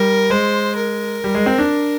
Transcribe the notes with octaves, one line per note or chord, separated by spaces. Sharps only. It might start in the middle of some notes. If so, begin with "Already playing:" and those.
Already playing: G3 A#4
G#3 C5
A#4
G3
G#3
C4
D4